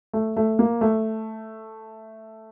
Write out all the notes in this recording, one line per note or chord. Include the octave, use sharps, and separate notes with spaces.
A3
A3
A#3
A3